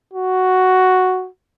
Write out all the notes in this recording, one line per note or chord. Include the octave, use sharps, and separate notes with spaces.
F#4